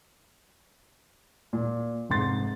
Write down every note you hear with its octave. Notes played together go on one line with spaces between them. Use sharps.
A#2
F1 G#2 C6 A6